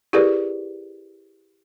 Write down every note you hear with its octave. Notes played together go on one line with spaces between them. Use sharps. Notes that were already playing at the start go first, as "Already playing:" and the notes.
E4 G4 G#4 A#4 B4 D5